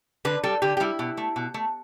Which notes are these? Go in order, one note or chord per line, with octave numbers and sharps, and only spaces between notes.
D3 B4
G3 A4
D3 G4
G4
G3 E4
B2
A3
B2
A3